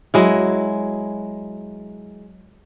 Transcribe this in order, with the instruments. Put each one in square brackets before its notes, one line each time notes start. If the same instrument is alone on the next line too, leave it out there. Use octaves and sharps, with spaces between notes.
[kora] F#3 G#3 E4